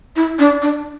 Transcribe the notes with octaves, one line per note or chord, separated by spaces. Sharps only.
E4
D4
D4